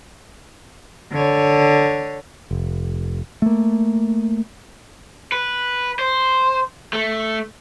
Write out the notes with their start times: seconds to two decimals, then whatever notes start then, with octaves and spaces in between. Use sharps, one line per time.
1.12 D3 C#5
2.51 F1
3.42 A3 A#3
5.32 B4
5.99 C5
6.93 A3